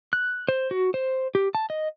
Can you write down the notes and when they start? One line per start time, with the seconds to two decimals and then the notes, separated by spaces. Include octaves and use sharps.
0.13 F#6
0.49 C5
0.71 F#4
0.94 C5
1.35 G4
1.55 A5
1.70 D#5